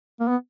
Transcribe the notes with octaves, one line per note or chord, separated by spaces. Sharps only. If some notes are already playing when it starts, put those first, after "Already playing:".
A#3
B3